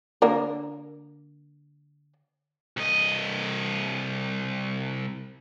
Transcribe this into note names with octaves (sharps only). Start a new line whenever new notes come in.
D3 A#3 A#4
C2 D#5